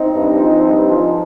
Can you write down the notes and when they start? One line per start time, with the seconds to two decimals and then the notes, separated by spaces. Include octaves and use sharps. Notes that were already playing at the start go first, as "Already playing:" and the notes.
Already playing: C4 D#4
0.14 G2
0.39 F3 G#3
0.63 G2
0.87 F3 G#3